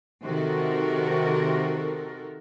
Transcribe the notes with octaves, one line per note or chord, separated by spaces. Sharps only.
C3 D#3 F#4 A4 A#4